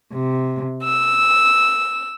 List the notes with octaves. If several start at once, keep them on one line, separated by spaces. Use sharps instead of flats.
C3
E6